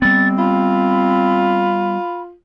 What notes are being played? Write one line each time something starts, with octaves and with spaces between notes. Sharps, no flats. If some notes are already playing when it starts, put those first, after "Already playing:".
G3 B3 C4 A6
F4 B5